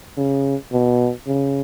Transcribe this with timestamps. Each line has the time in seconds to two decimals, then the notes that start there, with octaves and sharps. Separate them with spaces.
0.17 C#3
0.72 B2
1.27 C#3